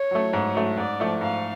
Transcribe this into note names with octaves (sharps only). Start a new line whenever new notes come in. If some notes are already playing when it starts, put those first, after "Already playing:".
Already playing: C#5
F#3 A3
G#2
F#3 A3
G#2 D5
F3 A3
G#2 F5